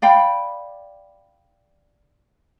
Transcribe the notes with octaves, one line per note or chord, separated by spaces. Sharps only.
D5 F5 G5 B5